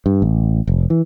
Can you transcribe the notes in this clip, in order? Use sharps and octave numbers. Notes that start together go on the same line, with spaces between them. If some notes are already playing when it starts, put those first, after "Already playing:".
G2
A1
F1
E3